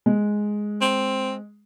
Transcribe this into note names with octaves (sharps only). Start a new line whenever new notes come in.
G#3
C4